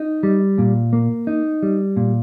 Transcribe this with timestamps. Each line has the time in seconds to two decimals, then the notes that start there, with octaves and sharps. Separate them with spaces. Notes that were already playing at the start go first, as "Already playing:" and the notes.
Already playing: D#4
0.23 G3
0.58 A#2
0.93 A#3
1.27 D#4
1.63 G3
1.97 A#2